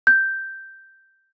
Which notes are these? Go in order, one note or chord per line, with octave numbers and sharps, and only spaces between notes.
G6